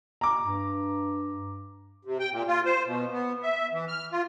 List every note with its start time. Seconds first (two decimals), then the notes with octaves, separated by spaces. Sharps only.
0.21 A#5 D6
0.42 G2
2.05 C3
2.20 G5
2.32 A#2
2.47 F4
2.65 C5
2.85 B2
3.12 B3
3.42 E5
3.72 E3
3.88 F6
4.12 F4